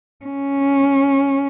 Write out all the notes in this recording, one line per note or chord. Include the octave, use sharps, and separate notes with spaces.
C#4